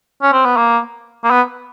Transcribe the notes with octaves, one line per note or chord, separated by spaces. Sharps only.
C#4
C4
B3
A#3
A#3
B3